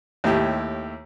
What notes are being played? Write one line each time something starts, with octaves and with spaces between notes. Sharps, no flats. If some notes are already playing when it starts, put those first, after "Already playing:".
D#2 A2 E4 G4